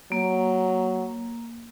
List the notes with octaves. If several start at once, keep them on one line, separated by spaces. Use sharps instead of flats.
F#3 A#3